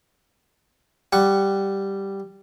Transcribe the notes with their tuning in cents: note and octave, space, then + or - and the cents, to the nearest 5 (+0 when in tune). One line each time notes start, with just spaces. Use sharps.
G3 +0 F#5 +0 C#6 +0